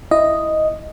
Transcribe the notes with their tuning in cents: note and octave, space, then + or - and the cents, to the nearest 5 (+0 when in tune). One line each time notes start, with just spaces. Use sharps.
E4 +0 D#5 +0